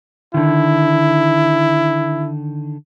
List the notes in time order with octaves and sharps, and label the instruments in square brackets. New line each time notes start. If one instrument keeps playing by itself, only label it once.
[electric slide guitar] D3 D#3 [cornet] E4